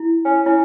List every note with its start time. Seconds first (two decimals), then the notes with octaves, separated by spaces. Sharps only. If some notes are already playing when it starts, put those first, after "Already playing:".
Already playing: E4
0.25 C#4
0.46 C#4 E4